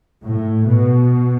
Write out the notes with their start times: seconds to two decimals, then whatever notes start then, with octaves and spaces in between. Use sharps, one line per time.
0.22 A2
0.65 B2